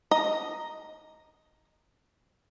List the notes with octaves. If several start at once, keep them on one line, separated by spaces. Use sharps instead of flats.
D#5 A#5